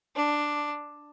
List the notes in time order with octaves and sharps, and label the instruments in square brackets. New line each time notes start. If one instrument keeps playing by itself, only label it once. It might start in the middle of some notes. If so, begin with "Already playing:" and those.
[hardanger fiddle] D4